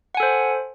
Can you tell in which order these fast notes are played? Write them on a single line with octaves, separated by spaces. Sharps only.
F#5 G#5 A4 C5